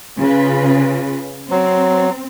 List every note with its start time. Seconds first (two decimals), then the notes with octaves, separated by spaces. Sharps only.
0.18 C#3 F4 B4
1.51 F#3 C4